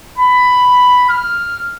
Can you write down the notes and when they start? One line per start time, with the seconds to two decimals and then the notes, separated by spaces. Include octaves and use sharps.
0.18 B5
1.09 F6